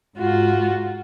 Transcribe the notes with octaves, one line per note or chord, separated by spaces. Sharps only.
G#2 F4 F#4